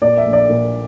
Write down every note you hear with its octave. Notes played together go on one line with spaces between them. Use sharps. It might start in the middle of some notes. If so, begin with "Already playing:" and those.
A#2 D5
E5
A#1
D5
A#2